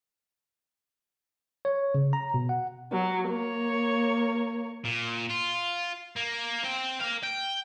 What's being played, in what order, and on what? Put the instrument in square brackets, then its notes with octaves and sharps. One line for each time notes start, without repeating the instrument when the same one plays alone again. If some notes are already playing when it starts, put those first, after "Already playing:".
[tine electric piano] C#5
C#3
A#5
B2
F#5
[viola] F#3
A#3 C#5
[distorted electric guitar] A#2
F4
A#3
C4 G5
A#4 F5
G5